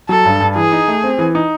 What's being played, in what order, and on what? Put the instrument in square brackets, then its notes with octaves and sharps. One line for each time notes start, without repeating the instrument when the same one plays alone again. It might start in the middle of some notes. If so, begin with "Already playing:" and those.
[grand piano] F#3 [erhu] A4
[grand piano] G2
G2
[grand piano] E3 [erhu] G#4
[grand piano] D#4
A3
C4
E3
D#4